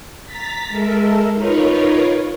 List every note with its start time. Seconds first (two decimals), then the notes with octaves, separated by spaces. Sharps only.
0.24 A#5 A6 B6
0.68 G#3 A4 A#4 E5
1.34 D#4 F4 A#4 B4 C#5